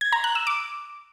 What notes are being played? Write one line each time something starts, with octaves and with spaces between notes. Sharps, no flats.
G#6
A#5
F#6
E6
D6